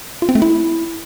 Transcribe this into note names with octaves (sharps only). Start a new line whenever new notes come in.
F4
C4
A3
E4